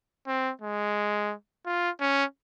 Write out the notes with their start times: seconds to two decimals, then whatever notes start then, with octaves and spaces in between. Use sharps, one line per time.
0.27 C4
0.62 G#3
1.66 F4
2.00 C#4